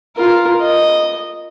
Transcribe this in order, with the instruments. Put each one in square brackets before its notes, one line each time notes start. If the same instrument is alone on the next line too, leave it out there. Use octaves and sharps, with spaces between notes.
[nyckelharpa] F4 A#4
D#5